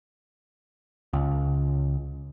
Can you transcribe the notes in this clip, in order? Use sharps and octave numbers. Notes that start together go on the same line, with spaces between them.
C#2